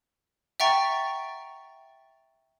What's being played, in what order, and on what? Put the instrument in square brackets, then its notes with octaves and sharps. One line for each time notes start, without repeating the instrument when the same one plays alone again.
[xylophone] E5 F#5 G5 A#5 C#6 A6